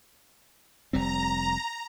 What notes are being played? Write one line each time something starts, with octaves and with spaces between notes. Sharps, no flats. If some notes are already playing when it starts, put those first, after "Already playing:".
F1 G3 C4 A#5